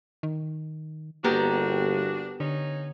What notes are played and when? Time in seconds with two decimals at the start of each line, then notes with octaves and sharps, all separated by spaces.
0.23 D#3
1.24 G1 A#3 B3 D4 F#4 G4 A#4
2.40 D3 C#4 D#4 C#5